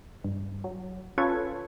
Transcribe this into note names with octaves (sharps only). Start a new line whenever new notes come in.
G2
F#3
C#4 F4 A4 B4 C#5 G#6